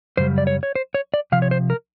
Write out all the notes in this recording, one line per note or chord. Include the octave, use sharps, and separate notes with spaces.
F#2 C#3 G3 C5
D5
C#5
C#5
C5
C#5
D5
C3 F3 F5
C#5
C5
A#4